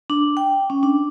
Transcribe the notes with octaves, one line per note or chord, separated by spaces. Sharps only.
D4
G5
C#4
D4